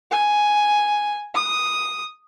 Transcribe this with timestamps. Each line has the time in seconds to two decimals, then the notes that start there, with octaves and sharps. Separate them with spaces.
0.11 G#5
1.35 D#6